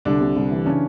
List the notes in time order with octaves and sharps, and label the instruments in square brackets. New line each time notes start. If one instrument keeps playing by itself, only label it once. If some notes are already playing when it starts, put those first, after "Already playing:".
[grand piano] C2 [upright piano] D3 D4
[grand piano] C3
C2
E3
[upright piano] C#3 C#4 [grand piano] D4